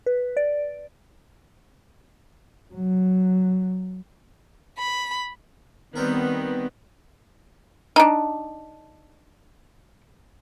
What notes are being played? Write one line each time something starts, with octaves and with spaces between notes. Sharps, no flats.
B4
D5
F#3
B5
D#3 G3 B3 C4 A#4
D4 D#4